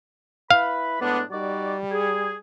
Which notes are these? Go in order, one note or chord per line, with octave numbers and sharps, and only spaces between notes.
E4 B4 F5 B5
A2 G#3 B3 D4
G3 D#4 F#4 D5
G#4